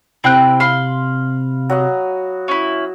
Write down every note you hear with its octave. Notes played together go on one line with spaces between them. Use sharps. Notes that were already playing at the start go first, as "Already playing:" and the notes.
C3 C4 E4 G5 F#6
F5 B5 C6
F#3 F#4 D#5
C#4 E4